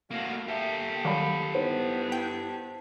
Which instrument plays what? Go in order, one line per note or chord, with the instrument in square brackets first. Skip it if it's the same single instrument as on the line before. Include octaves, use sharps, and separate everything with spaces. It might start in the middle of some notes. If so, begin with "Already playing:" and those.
[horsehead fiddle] A3 F5 [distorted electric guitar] A#3 F#4
[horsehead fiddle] A#3 G5 [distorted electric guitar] G4 A4 [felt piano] E5
[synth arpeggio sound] D#3 F#3 G3 [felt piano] F5 B5
[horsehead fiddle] B3 E4 [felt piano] D#4 C5
[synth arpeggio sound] G5